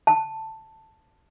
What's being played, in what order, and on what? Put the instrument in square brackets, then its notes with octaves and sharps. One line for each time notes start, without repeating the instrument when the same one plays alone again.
[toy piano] A5